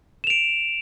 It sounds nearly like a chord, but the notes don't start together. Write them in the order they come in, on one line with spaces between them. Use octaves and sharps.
E7 F7 D7